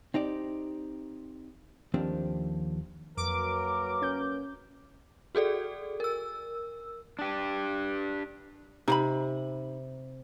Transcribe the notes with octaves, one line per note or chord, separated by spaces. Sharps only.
C4 D#4 G4 D5
D#2 F3 A#3 C4 D4 G4
F2 F#3 A#3 A#4 B4 D6
C#4 G6
F#4 G#4 A4 D5
A#4 E6
D4 G4
C3 D#4 F5 B5